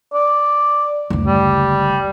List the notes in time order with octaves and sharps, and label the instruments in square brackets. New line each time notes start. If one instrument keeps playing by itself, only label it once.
[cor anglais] D5
[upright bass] F#1 D2
[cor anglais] G3